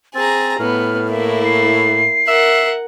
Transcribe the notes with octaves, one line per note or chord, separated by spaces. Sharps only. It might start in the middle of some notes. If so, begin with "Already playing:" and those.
C4 G#4 A#5 A6
A2 B3 F6
A#3 E4 E5
C7
A#4 E5 F#5